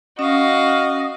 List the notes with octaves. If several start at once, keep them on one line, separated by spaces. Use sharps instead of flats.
C#4 F#4 D#5 F5